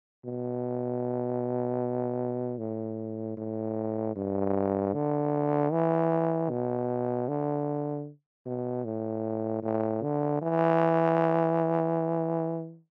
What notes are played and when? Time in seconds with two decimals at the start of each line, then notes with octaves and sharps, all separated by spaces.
0.25 B2
2.58 A2
3.37 A2
4.15 G2
4.94 D3
5.72 E3
6.50 B2
7.28 D3
8.46 B2
8.85 A2
9.62 A2
10.03 D3
10.42 E3